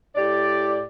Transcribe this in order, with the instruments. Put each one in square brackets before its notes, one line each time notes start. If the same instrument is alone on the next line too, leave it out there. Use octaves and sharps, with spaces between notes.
[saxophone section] A2 G4 D5